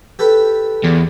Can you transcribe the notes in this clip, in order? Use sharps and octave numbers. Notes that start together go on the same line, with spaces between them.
G4 A4 B4
E2